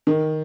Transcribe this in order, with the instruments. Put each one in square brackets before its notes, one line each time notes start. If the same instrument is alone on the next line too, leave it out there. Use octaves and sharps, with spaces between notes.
[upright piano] D#3